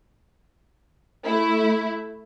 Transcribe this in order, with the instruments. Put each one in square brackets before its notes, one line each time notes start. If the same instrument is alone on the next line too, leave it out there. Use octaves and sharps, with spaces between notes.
[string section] A3 E4